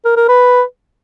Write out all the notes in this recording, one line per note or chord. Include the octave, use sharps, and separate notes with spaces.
A#4
A#4
B4